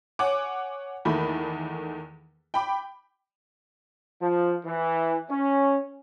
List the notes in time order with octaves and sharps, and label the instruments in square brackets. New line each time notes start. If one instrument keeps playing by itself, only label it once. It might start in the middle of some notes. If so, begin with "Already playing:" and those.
[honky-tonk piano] C#5 F#5 G#5 D6
E2 D#3 A3 A#3 B5
G5 B5 D6
[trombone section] F3
E3
C#4